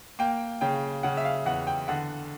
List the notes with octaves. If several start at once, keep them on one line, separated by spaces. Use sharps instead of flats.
A#3 G5
C#3 G5
C#3 F#5
E5
F5
E2 F#5
G5
D3 F#5